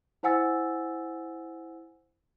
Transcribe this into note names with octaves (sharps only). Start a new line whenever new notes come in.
E4 C5 F#5 G#5 E6 A6